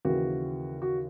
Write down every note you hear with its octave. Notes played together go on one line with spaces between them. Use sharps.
D#2 C#3 E3 F#4
F#4